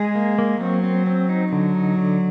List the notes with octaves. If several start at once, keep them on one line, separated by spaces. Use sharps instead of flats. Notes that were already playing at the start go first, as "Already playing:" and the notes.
Already playing: G#3 G#4
A#3
A#3
F#3 C4
C4
C4
D#4
D3 F#3
D#4
D3